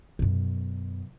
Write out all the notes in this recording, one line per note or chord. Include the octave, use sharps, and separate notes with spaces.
F#2 B2